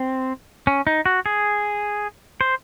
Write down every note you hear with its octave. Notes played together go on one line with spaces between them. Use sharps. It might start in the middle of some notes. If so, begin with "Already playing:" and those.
Already playing: C4
C#4
D#4
F#4
G#4
C5